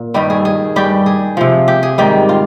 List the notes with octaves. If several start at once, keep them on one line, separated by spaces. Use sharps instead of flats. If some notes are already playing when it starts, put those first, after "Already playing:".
Already playing: A#2
G2 D#3 G3 G4
G#4
G#4
G2 G3 G4
G#4
C3 F3
G4
G#4
G#2 D#3 G3 G4
F4